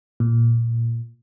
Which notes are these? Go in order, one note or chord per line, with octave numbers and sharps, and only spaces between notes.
A#2